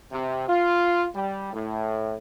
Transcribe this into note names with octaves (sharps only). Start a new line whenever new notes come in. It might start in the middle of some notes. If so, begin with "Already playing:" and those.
C3
F4
G3
A2